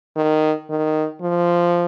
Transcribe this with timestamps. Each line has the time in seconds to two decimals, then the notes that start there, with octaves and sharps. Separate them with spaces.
0.16 D#3
0.70 D#3
1.22 F3